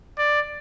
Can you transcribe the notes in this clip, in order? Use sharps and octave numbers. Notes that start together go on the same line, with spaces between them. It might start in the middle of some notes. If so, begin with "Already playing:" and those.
D5